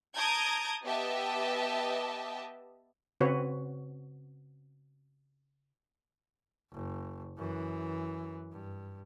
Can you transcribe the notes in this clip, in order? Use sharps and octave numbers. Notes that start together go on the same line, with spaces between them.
A5 A#5 D#6 G6 G#6 D7
B3 G4 D#5 E5 A5
C#3 C4 F#4 B4 C#5
F#1
F#2 E3
G2